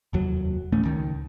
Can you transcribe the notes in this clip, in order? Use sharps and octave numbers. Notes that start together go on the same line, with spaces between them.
F1 D#2 F#3
D1 A1 A3 C#4
C#2 D#3